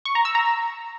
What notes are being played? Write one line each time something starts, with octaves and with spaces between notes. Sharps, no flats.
C#6
A#5
E6
A#5